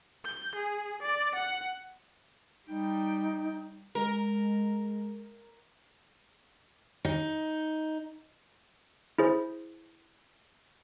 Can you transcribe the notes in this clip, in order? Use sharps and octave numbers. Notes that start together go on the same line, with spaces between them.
G6
G#4
D5
F#5
G3 D#4 G5
G#3 A#4
D#4
E4 G#4 C5